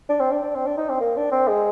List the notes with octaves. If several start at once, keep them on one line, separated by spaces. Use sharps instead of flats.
D4
C4
D4
D4
C4
D4
D#4
C4
A#3
D4
C4
G#3